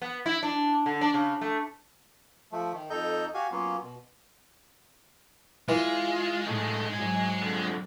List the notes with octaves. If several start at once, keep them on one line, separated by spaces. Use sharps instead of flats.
B3
E4
D4
D3
D4
C#3
A3
F3 A3
D#3
F2 D#4 A4 D#5 G6
F#4 G4 F5 G#5
F#3 A#3 B3 C#4 F4
B2
E3 G#3 F4
A2 A3 D#4
G#2 F#3 G#5
F2 D3